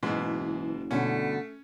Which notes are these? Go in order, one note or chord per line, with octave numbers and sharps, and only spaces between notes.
F#1 G#2 B2 E3
G2 B2 D3 A3 C#4